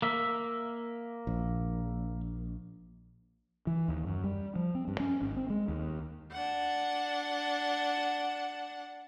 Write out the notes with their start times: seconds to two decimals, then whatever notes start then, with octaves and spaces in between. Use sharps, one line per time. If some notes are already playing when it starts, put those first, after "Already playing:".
0.02 A#3 E5
1.27 A#1
3.67 E3
3.88 D#2
4.06 F#2
4.24 G3
4.56 F3
4.75 C4
4.88 G2
5.00 C#4
5.21 G#1
5.36 C4
5.50 G#3
5.68 D#2
6.32 D4 F#5